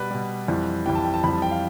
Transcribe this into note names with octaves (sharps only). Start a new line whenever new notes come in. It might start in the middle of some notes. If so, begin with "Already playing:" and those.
Already playing: B2 G3 B4 D5
B2 G3
F2 E3 G3
F2 E3 G3 G5
A5
G5
A5
F2 E3 G3 B5
A5
G5
F5